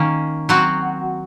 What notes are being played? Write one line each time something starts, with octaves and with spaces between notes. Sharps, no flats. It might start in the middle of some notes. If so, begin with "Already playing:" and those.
Already playing: D#3 A#3 C#4
F#3 C4 F#4